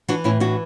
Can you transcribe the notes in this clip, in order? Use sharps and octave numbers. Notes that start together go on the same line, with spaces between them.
E3 D4 F#4
A2 C#4 E4
E3 D4 F#4